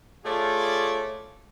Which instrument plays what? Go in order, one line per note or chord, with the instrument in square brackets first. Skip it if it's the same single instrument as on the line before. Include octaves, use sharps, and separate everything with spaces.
[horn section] A3 F4 G#4 C#5 D5